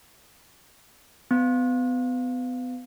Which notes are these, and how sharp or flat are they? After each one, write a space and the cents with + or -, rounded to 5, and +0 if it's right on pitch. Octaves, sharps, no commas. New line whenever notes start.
B3 +30